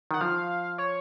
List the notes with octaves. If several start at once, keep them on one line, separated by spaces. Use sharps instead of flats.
D#3 F#5
F3 F5
C#5